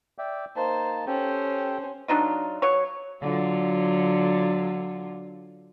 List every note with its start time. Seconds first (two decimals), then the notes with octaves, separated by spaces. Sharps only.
0.18 D5 E5 G5
0.56 A#3 D#4 C5 A5
1.07 C#4 G4 A4 C5 G5
2.08 F#3 D4 D#4 F4
2.62 F#3 C#5
3.21 D3 F#3 F4